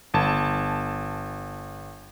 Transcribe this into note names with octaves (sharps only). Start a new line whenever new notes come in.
G1 A5